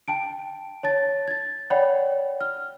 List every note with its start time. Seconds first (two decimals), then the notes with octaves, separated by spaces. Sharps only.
0.08 G5 A5 D7
0.83 C#5 A5 A6
1.28 G#6 A6
1.70 C#5 D5 F#5 G5 B5
2.41 F6